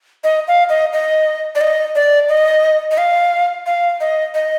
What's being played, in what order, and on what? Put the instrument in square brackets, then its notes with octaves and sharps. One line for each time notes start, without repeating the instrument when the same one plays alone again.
[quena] D#5
F5
D#5
D#5
D5
D#5
D5
D#5
D#5
F5
F5
D#5
D#5